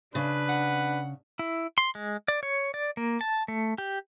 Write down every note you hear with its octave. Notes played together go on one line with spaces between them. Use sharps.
C#3 D4 B4
F#5
E4
C6
G#3
D5
C#5
D5
A#3
A5
A3
G4